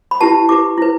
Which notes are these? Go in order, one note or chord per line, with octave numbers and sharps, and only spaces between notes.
B5
E4 G4 B4 A5
E4 G4 B4 D6
E4 B4